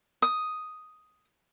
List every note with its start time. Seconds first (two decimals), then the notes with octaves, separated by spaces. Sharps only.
0.22 D#6